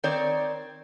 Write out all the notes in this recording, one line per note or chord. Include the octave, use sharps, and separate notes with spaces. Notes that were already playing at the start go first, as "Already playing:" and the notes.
D#3 C4 C#5 D5